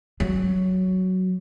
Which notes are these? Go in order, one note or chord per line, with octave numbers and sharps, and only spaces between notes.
F#3